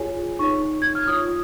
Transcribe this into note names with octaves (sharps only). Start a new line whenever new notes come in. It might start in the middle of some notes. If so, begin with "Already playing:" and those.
Already playing: F4 G#4 C#5 G#5
D#4 C#5 C#6
G#6
F6
F4 C#5 D#6